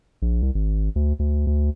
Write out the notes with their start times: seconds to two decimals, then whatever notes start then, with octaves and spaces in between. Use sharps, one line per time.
0.22 A#1
0.42 C2
0.55 G#1
0.96 D2
1.19 D2
1.47 D2